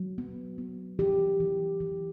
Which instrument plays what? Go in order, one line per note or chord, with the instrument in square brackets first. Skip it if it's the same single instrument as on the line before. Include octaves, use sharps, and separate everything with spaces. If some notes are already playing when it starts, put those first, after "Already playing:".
Already playing: [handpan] F#3
B3
B3
E3 G4
E3
E3